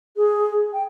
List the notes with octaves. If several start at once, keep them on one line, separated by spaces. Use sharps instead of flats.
G#4
G5